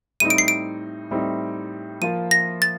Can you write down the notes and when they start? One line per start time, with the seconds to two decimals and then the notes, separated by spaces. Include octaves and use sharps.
0.20 A2 G3 C4 D#4 D#7
0.30 D7
0.38 C7
0.48 D7
1.11 A2 G3 C4 D#4
2.01 F3 A#3 F4 D#7
2.31 A#6
2.62 A6